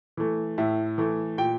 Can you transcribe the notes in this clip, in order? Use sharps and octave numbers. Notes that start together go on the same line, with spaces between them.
E3 A3
A2 E5
E3 A3
A#2 G5